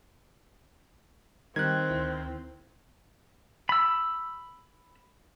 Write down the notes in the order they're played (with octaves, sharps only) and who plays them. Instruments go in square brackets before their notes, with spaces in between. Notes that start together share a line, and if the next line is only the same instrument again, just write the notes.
[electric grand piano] D#3 [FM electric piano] G3 [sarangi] C4 [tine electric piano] F#6 G#6
[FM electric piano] D2 E4
[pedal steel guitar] B5 E6